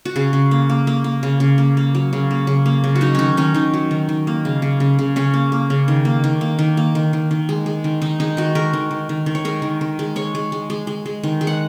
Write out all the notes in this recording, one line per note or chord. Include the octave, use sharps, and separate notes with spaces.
F#4
C#3 G#4
C#3
A#3
A#3
A#3
A#3
C#3
C#3
A#3
A#3
F#3
C#3
A#3
C#3
A#3
C#3
F#4
F#3 D#4
D#3 C#4 D#4
D#3 C#4
D#3 D#4
F#3
D#3
D#3
A#3
C#3
C#3
C#3
C#3
C#3 C#4
A#3
A#3
C#3
D#3
A#3
D#3
A#3
D#3
A#3
D#3
D#3
D#3
G#3
G#3
D#3
D#3 D#4
G#3 D#4
D#3 F#4
G#3 A#4
D#3
D#3
D#3
D#3
C#5
G#3 A#4
D#3
D#3
G#3
G#3 C#5
G#3
G#3
G#3
G#3
G#3
D#3
G#3
F#5